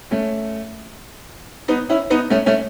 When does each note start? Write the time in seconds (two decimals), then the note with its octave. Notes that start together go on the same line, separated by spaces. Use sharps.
0.11 A3 C#4
1.68 B3 D#4
1.90 C#4 E4
2.10 B3 D#4
2.30 A3 C#4
2.46 A3 C#4